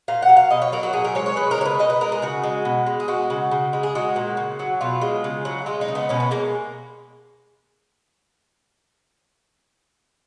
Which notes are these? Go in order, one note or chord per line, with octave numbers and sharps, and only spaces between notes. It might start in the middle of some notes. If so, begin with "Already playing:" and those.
A#2 F5
F#5
F#3
F5
B2 D#5
C#5
F#3 A#4
F#4
A#2 G#4
A#4
G#3 C#5
C#5
G#3 B4
A#4
C#3 C#5
B4
B2 D#5
B4
G#3 A#4
G#4
C#3 F#4
G#3
B2
G#3
G#4
G#3 F#4
C#3
C#3
G#3
G#4
G#3 F#4
A#2
C#3
F#3
B2 F4
G#3
C#3
F#3
G#3 F4
D#4
C#3
B3
B2 C#4
B3
G#3 A#3